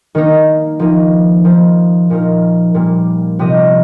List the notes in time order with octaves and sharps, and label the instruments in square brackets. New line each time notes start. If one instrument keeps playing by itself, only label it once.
[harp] D#3 A#3 D#4
F3 A#3 D#4
F3 A#3 D#4 C5
A#2 F3 D#4 A#4
A#2 G3 A#3
C3 F3 C4 G4 D#5